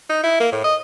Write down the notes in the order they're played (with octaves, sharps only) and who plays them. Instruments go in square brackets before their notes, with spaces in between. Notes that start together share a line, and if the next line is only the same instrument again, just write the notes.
[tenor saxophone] D#4
E4
A#3
A2
D#5